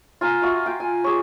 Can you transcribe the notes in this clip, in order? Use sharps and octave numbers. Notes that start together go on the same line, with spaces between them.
F4 G#5 A#5
F4 F#4 E5
F4 G5
G#5
G4 G#4 C#5